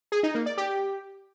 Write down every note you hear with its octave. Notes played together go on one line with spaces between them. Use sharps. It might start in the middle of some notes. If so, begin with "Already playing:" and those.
G#4
D#4
A#3
D5
G4